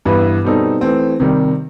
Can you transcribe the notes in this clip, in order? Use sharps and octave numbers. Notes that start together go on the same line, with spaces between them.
G2 E3 B3 E4 B4
B2 G3 C4 D#4 A4
E3 A3 C4
C3 D#3 G3